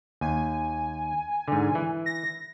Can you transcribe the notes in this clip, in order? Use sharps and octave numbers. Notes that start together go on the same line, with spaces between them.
D#2 G#5
G#2 D3
E3
A#6